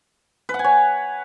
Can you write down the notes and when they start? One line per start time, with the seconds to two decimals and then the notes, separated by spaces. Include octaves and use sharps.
0.49 B4
0.54 F#5
0.59 G#5
0.64 C#5